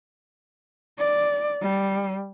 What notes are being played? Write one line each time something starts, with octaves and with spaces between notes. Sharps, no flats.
D5
G3